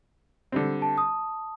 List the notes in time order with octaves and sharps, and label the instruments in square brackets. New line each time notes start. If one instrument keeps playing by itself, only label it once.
[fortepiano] D3 G3 C4
[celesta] A5
D#6